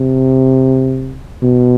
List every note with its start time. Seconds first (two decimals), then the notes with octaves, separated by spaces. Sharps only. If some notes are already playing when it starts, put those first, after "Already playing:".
Already playing: C3
1.42 B2